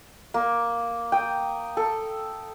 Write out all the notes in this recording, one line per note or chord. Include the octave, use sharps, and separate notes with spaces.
A#3
G5 D#6
A4